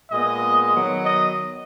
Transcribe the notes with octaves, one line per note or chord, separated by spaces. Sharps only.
A#2 G#3 B3 D#5
D#3 F#3 B3
D#5